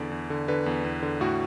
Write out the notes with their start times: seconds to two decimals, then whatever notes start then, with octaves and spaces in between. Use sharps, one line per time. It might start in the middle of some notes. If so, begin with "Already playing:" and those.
Already playing: E2 D3 D5
0.11 E2
0.30 D3
0.48 D3 B4
0.66 E2
0.85 E2
1.02 D3
1.21 A2 F#4